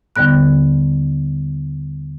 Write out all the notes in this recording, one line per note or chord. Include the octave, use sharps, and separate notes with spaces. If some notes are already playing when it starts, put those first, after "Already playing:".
D#2 D3 G3 B3 F#6